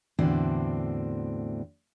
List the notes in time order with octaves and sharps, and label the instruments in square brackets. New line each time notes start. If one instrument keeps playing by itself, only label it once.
[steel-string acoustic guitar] E2 A2 D3 C4 F#4 D5